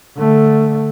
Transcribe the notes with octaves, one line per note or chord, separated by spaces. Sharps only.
D3 A3